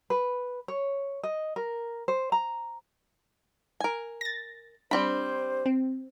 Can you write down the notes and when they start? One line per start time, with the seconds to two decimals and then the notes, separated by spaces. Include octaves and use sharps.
0.10 B4
0.68 C#5
1.23 D#5
1.56 A#4
2.08 C5
2.32 A#5
3.80 A#4 G#5
4.21 A6 A#6
4.91 G3 C4 D4 C5 B5
5.66 C4